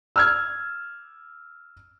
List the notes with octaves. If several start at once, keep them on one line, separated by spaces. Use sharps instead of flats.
E6 F6 G#6